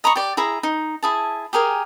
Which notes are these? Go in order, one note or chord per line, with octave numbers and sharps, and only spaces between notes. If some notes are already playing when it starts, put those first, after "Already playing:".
D#5 A#5 B5 C#6
G4 D5
E4 G#4 A#5
D#4
E4 G#4 A5
G4 G#4 A#4 G#5